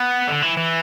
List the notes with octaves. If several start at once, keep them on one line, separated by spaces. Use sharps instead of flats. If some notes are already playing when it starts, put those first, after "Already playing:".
Already playing: B3
D3
E3
E3